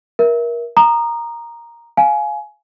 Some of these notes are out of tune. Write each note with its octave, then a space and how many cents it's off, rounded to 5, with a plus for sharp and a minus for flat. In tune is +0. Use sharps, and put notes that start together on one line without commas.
A#4 +25 E5 +0
A#5 +0 D#6 -30
F5 +0 G#5 +20